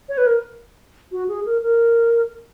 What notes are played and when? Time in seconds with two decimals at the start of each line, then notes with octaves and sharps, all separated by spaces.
0.09 C#5
0.18 B4
0.27 A#4
1.12 F#4
1.28 G#4
1.46 A#4
1.62 A#4